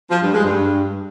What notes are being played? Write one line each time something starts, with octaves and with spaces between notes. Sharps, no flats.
F3
G2
G#3
G2